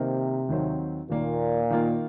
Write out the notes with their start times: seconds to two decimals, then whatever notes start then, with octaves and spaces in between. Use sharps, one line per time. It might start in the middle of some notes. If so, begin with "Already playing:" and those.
Already playing: C3 D#3 A#3 D#4 A#4 D#5
0.49 D#2 D#3 F#3 C4
1.09 D#2 A#2 D#3 A#3
1.70 D#3 A#3 F4 A#4